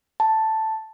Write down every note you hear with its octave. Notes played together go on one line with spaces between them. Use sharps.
A5